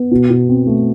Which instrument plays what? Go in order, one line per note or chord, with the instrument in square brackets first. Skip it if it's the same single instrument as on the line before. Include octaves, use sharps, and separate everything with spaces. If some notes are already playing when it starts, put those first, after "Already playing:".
Already playing: [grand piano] B3
B2
B2
C4
A3